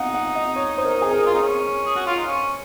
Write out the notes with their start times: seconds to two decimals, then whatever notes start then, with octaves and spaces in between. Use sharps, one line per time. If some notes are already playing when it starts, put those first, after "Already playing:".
Already playing: D#4 F5 F#5
0.14 F#5
0.35 D#5
0.56 C#5
0.78 C5
0.85 A#4
1.02 G#4
1.13 A#4
1.26 F4
1.34 D#4
1.42 C#4
1.86 G#4
1.96 F#4
2.06 F4
2.16 D#4
2.26 C#4